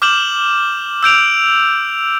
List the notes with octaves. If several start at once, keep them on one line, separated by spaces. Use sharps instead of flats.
D6 F6 G6 E7 F#7
E6 G6 D7 F7